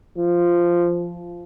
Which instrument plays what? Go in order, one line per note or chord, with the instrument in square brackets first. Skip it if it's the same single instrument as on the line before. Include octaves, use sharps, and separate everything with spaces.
[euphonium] F3